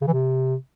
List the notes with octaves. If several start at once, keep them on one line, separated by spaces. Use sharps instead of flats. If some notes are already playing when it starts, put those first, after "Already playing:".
C#3
E3
C3